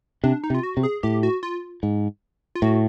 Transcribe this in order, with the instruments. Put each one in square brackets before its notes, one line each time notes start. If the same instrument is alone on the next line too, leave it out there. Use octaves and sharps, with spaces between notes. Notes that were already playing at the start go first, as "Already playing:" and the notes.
[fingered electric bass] C3 [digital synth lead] D4
[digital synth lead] D#4
[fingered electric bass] C3
[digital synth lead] F4
F#4
[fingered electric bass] C3
[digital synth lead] G#4
[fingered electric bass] A2 [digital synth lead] G4
[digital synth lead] F#4
F4
[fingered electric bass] G#2
[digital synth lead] F4
[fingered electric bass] A2 [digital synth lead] F#4